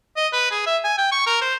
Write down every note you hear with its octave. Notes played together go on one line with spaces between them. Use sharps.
D#5
B4
G#4
E5
G#5
G5
C#6
A#4
C5